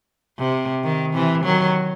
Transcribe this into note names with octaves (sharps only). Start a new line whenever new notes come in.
C3
D#3
C3 E3
D#3 F#3